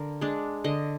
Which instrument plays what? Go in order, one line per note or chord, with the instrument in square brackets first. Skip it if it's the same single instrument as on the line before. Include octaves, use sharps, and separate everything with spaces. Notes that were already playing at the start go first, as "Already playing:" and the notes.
Already playing: [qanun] D3 A#4
G#3 D4
D3 D#5